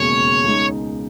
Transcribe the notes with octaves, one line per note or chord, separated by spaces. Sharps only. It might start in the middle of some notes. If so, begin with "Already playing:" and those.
Already playing: E1 D#2 C#3 G#3 C#5
C#2 C#3 G#3 D#4